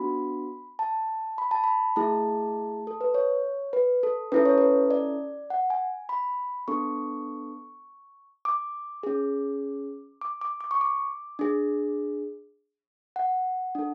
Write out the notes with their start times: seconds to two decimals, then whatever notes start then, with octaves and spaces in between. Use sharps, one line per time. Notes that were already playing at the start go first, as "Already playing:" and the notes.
Already playing: B3 D4 F#4 B5
0.79 A5
1.38 B5
1.51 A5
1.64 B5
1.96 A3 E4 G#4 A5
2.87 A4
3.01 B4
3.14 C#5
3.73 B4
4.03 A4
4.32 C#4 E4 A4 B4
4.45 C#5
4.58 B4
4.91 D5
5.50 F#5
5.70 G#5
6.09 B5
6.68 B3 D4 A4 C#6
8.45 D6
9.03 C#4 G#4
10.21 D6
10.41 D6
10.61 D6
10.71 C#6
10.81 D6
11.39 D4 G#4
13.16 F#5
13.75 D4 A4